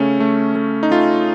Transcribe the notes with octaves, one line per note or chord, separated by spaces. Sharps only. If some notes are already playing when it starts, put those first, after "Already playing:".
Already playing: C#3 A3 C#4
A3
A3
D#4
A3 F4